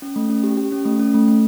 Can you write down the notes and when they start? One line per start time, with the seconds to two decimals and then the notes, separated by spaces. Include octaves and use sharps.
0.02 C#4
0.16 A3
0.30 C#4
0.43 G4
0.57 G4
0.72 C#4
0.85 A3
1.00 C#4
1.14 A3
1.28 A3